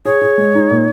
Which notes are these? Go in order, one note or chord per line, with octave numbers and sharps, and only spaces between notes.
G#4 C#5
G#4
G#3
D#4
A#2